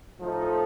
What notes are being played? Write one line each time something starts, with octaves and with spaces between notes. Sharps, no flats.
A2 F3 A3 D#4 A4